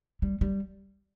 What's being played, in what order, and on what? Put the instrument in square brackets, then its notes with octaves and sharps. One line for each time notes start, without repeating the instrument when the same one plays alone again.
[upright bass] G3
G3